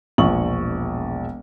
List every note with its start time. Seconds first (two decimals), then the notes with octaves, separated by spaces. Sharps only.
0.18 E1 A#1 F3 C#6 F#7